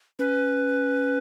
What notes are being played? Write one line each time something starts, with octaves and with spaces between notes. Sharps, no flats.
C#4 B4